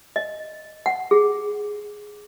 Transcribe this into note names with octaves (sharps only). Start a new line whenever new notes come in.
D#5
F#5
G#4